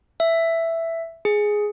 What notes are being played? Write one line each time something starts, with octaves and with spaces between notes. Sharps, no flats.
E5
G#4